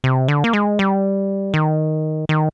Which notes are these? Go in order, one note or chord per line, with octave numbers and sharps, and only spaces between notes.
C3
D3
A#3
G#3
G3
D#3
D#3